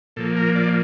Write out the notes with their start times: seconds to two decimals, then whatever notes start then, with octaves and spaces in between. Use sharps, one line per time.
0.16 A#2 F3 A#3 A4
0.36 A#4
0.55 D5